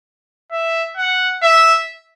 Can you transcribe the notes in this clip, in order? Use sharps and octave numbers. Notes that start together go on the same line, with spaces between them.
E5
F#5
E5